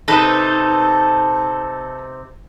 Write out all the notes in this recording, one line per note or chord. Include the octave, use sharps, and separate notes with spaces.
C3 D#4 A4 B4 F#6